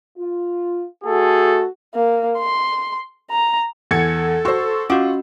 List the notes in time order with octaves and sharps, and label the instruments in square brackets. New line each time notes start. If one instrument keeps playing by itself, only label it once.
[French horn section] F4
[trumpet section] A3 G#4 A4 [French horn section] F#4
[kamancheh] A#3
C6
A#5
[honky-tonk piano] E2 G#6 C#7 [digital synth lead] A4
[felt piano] F#4 C5 [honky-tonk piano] C6 C#6 E6
[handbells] C#4 F#4 D#5 [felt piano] F4 F#5 D6